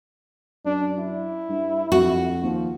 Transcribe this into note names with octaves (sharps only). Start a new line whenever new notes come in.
F#2 D4
E4
G2
F2 F#4
D#2 F3